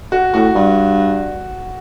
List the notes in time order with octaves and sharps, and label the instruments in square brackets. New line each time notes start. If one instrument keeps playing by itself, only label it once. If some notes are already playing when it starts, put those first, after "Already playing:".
[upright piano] F#4
[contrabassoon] A2 [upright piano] F#4
[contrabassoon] G2